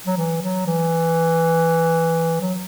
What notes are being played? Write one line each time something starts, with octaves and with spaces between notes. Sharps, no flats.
F#3
E3
F#3
E3
F#3